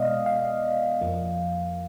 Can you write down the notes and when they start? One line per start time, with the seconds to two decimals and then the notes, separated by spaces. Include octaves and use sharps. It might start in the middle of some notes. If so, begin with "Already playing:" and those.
Already playing: B2 G#3 B3 D5 D#5 F5
0.26 F5
1.01 F2 F3 A#3